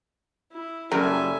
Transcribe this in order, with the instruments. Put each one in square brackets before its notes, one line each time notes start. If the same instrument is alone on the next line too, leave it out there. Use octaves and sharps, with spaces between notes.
[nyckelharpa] E4
[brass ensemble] F#1 G3 A4 [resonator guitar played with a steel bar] F#2 [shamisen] A#4 [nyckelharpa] E5 G#5